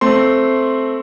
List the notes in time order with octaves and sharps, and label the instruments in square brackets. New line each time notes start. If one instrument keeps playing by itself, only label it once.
[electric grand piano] A3 C4 C6